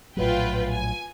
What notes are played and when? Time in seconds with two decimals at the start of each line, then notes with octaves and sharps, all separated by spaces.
0.17 A#1 A2 F#3 F4 B4 G5
0.71 G#5